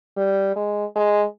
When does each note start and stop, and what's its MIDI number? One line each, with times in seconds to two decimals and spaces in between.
0.17 0.51 55
0.56 0.85 56
0.95 1.24 56